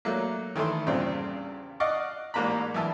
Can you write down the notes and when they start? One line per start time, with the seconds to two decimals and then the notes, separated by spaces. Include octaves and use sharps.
0.05 F#3 A3 A#3
0.56 D#3 E3 A3 A4 C6
0.86 E2 G2 A#2 C#3 C4
1.80 D5 D#5 F5 F#5 C#6
2.34 A1 G#2 A#3 A#5 B5
2.74 B1 E3 E5 A5